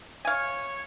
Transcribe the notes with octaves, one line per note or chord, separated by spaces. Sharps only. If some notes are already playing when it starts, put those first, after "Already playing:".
C#5 F5 G#5